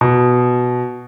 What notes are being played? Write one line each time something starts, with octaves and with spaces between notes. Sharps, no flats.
B2